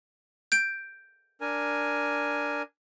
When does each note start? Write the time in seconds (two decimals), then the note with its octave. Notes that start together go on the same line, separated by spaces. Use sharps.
0.52 G6 D7
1.41 D4 A#4 G#5